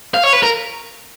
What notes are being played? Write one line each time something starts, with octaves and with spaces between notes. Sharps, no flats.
F5
C#5
B4
A#4